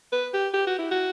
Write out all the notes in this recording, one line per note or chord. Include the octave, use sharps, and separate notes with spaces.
B4
G4
G4
F#4
E4
F#4